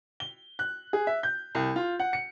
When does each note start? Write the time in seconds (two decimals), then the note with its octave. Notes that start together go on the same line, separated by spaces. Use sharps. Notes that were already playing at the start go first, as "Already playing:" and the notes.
0.20 G7
0.59 F#6
0.93 G#4
1.07 E5
1.23 G6
1.55 C2
1.76 F4
2.00 F#5
2.13 C#7